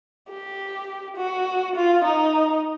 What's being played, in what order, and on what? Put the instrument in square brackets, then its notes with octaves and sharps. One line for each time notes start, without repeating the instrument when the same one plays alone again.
[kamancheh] G4
F#4
F4
D#4